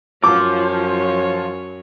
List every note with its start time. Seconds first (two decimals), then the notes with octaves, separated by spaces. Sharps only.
0.24 F#2 F3 C#5 D6